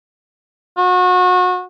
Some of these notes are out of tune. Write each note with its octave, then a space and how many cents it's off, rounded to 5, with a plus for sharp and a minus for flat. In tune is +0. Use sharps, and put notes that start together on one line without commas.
F#4 -30